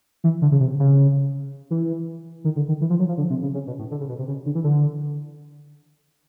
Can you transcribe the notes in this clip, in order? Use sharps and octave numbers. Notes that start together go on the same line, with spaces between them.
E3
D3
C#3
C3
C#3
E3
D#3
D3
D#3
E3
F3
F#3
F3
D3
C3
C#3
C#3
B2
A2
D3
C#3
B2
C3
C#3
D3
E3
D3